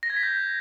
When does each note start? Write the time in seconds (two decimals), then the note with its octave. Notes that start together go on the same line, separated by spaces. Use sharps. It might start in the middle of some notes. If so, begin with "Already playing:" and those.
0.03 A#6
0.10 G#6
0.16 B6
0.23 G6